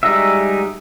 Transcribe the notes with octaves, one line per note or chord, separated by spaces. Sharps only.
G3 G#3 D#4 F#4 E5